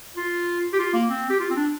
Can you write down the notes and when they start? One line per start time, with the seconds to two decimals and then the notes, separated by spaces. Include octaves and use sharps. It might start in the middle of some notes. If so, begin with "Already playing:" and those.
0.17 F4
0.73 G4
0.79 F4
0.93 A#3
1.09 C4
1.30 G4
1.40 F4
1.50 C4
1.56 D4